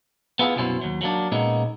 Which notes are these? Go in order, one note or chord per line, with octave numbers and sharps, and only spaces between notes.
B3 E4 F4 G#4
C2 F#2 B2 C#4 E4 C5
D#2 F#3
F#3 A#3 D4
A#2 G#3 A#3 B3 C#4 D#4